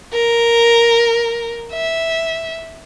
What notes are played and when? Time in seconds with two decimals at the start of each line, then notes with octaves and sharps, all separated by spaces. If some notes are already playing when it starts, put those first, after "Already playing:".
0.13 A#4
1.72 E5